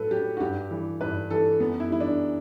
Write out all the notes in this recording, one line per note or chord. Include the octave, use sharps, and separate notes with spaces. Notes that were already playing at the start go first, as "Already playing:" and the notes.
Already playing: A2 F#3 A4 B4
F#3 G4
F#4
G2 G4
E3 G3
G2 B4
E3 G3 A4
F#2 B3
E4
E3 G3 E4
D4